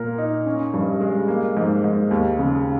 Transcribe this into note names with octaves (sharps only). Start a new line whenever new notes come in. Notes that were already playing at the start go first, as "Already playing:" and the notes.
Already playing: A#2 A#4
D#4
C#4
G2
G#3
A#3
G#2
G#2
D#2
C#3